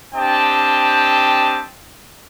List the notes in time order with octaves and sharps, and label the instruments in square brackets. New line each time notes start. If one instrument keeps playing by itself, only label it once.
[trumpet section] C4 D4 G4 D#5 G5 A5